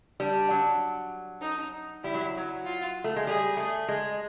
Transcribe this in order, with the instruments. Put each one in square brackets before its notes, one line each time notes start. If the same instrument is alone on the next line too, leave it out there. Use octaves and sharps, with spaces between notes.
[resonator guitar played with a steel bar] G3 [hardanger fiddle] D4
[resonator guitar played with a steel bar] F#3
[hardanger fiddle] D#4
[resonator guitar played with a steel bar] G3 [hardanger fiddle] E4
[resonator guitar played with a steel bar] F#3
F#3
[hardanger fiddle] F4
[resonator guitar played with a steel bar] A3
G#3
[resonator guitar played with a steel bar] G3 [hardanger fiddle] G#4
[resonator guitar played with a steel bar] A3
G#3